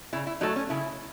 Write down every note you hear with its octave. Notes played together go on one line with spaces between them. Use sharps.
C#3 E4
E4
F#3 A3 D#4
C#4
C#3 E4